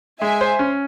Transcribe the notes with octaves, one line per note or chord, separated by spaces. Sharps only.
G#3 E5 G#5
C5
C#4